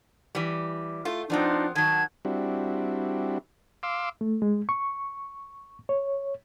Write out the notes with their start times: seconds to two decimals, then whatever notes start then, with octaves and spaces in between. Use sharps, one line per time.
0.35 E3 G3
1.05 A3 F4
1.30 F3 B3 C4 D4 D#4 F4
1.75 D#3 F#3 A5 G#6
2.25 G3 C4 D4 E4 F#4
3.83 F5 C6 D6 E6
4.21 A3
4.42 G#3
4.69 C#6
5.89 C#5